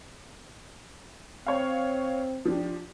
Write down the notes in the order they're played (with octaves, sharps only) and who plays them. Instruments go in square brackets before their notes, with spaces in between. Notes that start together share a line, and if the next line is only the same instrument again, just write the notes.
[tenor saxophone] C4 [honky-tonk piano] C#5 F5
[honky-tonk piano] F3 D4 G4